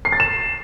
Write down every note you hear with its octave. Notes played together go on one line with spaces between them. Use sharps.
C7
A6
E7